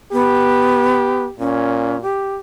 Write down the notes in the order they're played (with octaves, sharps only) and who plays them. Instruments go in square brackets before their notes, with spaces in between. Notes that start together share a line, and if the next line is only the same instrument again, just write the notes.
[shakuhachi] B3 [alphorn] G4
[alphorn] A#2 [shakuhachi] C#4
[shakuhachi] G4